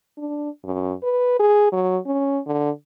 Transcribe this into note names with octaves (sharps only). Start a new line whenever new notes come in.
D4
F#2
B4
G#4
F#3
C#4
D3